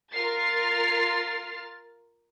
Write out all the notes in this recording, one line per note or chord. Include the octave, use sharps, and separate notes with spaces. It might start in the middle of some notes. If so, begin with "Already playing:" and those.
F4 A#4 F6 A6 C7